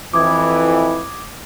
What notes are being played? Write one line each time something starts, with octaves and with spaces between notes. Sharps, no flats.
F2 E3 D6 D#6 G#6